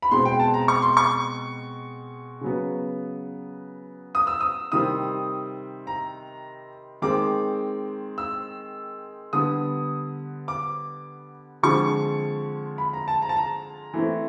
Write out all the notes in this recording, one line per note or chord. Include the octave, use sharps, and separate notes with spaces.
B5
B2 G#3 C4 C6
G5
A5
A#5
C#6
C6
C#6
C#3 F#3 B3
D#6
E6
D#6
C3 D#3 G3 C4 D#6
A#5
D#3 G#3 C4 D6
E6
D3 G3 B3 D#6
D6
D3 F3 G#3 C4 C#6
B5
A#5
A5
A#5
A5
A#5
E3 A3 C4